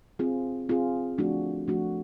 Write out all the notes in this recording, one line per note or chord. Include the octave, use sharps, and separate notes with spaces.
C4 F4 G#4
C4 F4 G#4
F3 A3 D4 F#4
F3 A3 D4 F#4